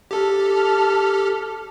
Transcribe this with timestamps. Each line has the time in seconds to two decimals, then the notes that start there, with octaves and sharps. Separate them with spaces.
0.11 G4 A4 A5 F6